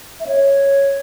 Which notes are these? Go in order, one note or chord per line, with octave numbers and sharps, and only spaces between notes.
E5
C#5